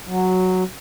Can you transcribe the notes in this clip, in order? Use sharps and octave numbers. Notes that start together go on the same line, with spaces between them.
F#3